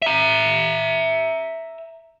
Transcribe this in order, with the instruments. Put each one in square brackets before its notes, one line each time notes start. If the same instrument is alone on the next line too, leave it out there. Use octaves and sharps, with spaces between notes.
[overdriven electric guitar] E5 A#5